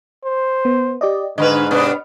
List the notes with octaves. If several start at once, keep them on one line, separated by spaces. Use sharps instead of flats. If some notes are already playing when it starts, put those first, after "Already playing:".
C5
B3
G4 D5 D#5
G#2 D3 B4 D#5 B5 F6
C3 B3 D4